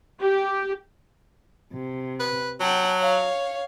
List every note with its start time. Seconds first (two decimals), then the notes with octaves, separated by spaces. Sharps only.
0.21 G4
1.74 C3
2.20 B4
2.60 F#3 F#5 G5 A5
3.00 C#5 F5